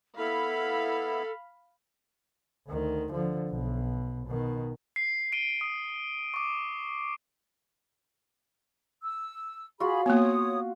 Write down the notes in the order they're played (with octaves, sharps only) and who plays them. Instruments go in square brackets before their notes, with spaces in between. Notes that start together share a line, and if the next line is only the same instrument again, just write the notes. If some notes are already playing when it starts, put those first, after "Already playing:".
[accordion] B3 E4 [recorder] A4 [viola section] F5 B5
[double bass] D2 D#3
D3 F3
B1 B2
B2 D#3
[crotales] C7
C7 D7 D#7 G7
D#6
C#6 D6
[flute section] E6
[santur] F4 F#4 [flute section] G#4 B5
[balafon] A#3 B3 [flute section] C#5 D#6